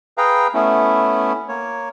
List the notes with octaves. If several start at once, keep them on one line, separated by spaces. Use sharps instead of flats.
G#4 B4 F5 G5 A#5
A3 B3 C#4 E4
A#3 C#5